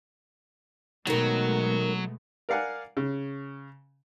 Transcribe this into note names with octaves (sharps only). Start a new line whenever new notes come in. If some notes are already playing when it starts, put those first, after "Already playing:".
B2 D#3 F#3 G#3 A3 B3 A#4
A#4 D5 F5 F#5 G#5
C#3